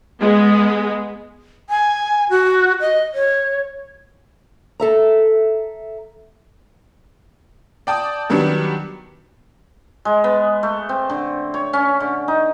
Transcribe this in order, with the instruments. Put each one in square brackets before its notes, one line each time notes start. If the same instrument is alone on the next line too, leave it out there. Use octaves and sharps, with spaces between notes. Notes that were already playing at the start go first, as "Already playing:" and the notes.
[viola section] G#3 B3
[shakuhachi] G#5
F#4
D#5
C#5
[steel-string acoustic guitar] A4 E5 A#5
[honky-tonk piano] D5 G5 A5 D#6
D#3 F#3 G3 B3 D4
[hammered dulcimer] G#3
B3
A3
C4
D3
C#5
C#4
D3
D#4